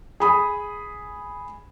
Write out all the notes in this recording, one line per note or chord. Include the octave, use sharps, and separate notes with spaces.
G#4 B5 D#6